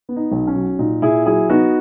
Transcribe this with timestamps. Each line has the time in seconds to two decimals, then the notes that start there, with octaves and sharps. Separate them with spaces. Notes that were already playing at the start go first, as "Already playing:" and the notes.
0.09 B3
0.16 D#4
0.31 B1
0.47 C#4
0.56 F#3
0.79 A#2 D#4
1.02 A#2 E4 G#4
1.26 F#3 E4 G#4
1.50 B3 D#4 F#4